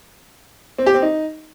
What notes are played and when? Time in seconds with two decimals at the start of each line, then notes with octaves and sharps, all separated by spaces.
0.78 C4
0.86 G4
0.94 C4
1.02 D#4